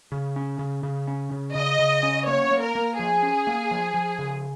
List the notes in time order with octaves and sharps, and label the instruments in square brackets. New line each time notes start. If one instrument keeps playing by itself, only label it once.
[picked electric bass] C#3
C#4
C#3
C#3
C#4
C#3
[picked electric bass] C#3 [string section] D#5
[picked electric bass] C#3
C#4
[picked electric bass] A#3 [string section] C#5
[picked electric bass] A#3
[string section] A#4
[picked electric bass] A#3
[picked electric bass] F3 [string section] G#4
[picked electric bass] C#4
A#3
F3
F3
C#3